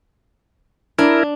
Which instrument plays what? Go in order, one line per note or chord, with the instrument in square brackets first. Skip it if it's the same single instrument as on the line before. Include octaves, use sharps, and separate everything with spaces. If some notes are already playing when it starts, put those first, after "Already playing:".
[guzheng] D4 [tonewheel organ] E4 A#4